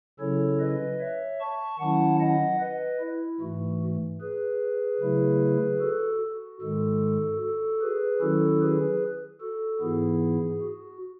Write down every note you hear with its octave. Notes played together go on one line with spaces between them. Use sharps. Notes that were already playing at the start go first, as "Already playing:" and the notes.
C#3 F#3 C#4 E4 A4 C#5
B4 D#5
C#5 E5
A5 C#6
D#3 F#3 C#4 E4 F#5 A5
D#5 F#5
B4 D#5
E4
G#2 E3 A3 F#4
G#4 B4
C#3 F#3 A3 E4
F#4 A4
F#4
G#2 D#3 G#3 F#4 A4
F#4 A4
G#4 B4
D#3 F#3 C#4 E4 F#4 A4
G#4 B4
F#4 A4
G#2 E3 B3 E4 G#4
F#4